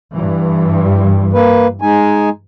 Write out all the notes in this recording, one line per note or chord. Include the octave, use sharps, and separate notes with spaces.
G2 E3
A#3 B4
G#3 D#4 G#5